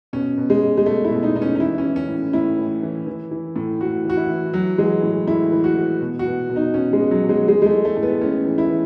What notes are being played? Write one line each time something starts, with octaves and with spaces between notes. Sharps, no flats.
B2 C#4
B2
G#3
B2
G#3
B2 A3
E4
B2
D#4
B2 D#4
C#4
D#4
E3 E4
C#4
E3
C#4
A2
A2 E4
E3
E3
E3
E3
A2
A2 F#4
E3
F#4
E4
E3
E3 F#3
E3 G#3
A2
A2 E4
E3
F#4
E3
B2
F#4
B2
B2
D#4
B2 C#4
G#3
B2
F#3
B2
G#3
E3 G#3
G#3
A3
E3
A3
A2 A3
B3
A2 C#4
E3
E4
E3